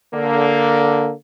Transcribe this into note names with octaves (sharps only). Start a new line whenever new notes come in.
D3 A#3